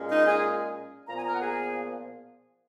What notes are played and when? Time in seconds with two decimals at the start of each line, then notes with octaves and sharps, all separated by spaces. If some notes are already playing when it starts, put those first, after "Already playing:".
Already playing: A#2 G#3 C#4
0.10 D#4 D#5
0.26 G#4 G#5
1.07 A#2 F3 B3 A#5
1.16 G#5
1.25 A#4 A#5
1.33 F#5
1.40 G#4 G#5